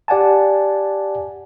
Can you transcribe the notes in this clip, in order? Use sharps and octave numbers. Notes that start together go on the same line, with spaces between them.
G4 D5 F#5 G#5 A5